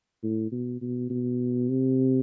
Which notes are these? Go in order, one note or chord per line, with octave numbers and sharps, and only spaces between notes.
A2
B2
B2
B2
C3